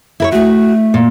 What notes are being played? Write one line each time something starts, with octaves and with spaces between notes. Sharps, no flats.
E4 A#4 C#5
A3 F#4
A#2